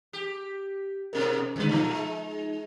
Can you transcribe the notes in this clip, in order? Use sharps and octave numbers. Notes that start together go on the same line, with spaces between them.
G4
G#2 B2 C#4 A#4
F#2 D3 D#3 G#3 B4
A#2 F3 A3 D#4
G#3